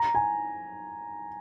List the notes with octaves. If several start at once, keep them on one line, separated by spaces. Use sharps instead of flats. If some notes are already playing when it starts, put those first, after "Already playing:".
Already playing: A#5
G#5